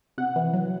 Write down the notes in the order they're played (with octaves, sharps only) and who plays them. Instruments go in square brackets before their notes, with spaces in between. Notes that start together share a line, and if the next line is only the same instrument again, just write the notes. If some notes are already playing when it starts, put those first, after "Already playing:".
[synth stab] C3 F#5
E3
F#3